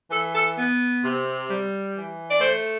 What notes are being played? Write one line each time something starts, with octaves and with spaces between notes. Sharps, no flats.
E3 A4
A4
B3
C3
G3
E3
D5
A3 C5